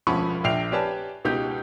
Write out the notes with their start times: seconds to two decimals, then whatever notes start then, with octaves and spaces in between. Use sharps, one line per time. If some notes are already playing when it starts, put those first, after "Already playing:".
0.07 E1 D2 F3 C#4 B5 C#6
0.44 A#1 D4 G5 C7 F7
0.72 G4 B4 C#5 D5 G#5 A5
1.25 C#2 B2 D#4 G4 G6